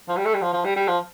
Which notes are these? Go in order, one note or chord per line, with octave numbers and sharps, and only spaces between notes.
F3
G3
A3
G3
F3
F3
G3
G3
F3